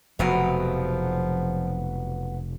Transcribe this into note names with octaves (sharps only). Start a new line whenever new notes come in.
F1 B2 F3 F#3 B3 F5